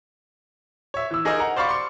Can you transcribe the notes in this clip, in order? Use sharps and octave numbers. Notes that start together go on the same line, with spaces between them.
C#5 E5
E3 E6
D#4 G#4 A#4 C5 D#5
F#5 A#5
C5 D5 F5 B5 C#6
C6 D6 C#7